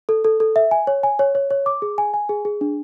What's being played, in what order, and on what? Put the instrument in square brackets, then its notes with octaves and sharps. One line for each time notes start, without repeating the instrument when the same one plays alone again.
[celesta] A4
A4
A4
E5
G#5
C#5
G#5
C#5
C#5
C#5
D6
G#4
G#5
G#5
G#4
G#4
D4